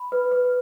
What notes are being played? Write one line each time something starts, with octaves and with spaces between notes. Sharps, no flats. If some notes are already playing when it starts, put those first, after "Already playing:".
Already playing: B5
B4
B4